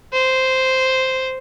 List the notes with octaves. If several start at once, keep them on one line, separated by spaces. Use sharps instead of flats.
C5